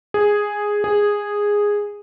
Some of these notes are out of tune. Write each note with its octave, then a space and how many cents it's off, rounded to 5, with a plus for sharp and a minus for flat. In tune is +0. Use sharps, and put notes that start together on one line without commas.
G#4 -5
G#4 -10